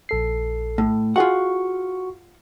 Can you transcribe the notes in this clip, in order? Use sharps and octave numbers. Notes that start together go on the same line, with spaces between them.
A#1 A4 C7
A2
F4 F#4 G#4 F#5 C#6